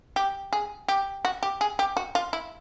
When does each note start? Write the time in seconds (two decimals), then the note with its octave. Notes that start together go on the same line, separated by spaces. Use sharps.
0.16 G4
0.53 G#4
0.88 G4
1.25 F#4
1.43 G4
1.61 G#4
1.79 G4
1.97 F#4
2.15 F4
2.33 E4